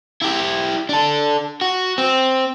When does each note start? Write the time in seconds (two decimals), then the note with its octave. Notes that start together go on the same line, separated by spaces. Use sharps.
0.22 E4 G4
0.89 D4 A4
1.61 F#4
1.98 C4